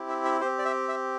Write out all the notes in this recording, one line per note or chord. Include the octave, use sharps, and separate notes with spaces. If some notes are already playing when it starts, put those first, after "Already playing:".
Already playing: C4 E4 G4
E5
E5
C4 G4 C5
D5
E5
E5